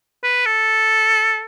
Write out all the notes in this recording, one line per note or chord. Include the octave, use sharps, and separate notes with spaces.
B4
A4